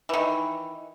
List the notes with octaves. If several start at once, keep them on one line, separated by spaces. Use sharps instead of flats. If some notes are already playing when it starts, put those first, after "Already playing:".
D#3 E3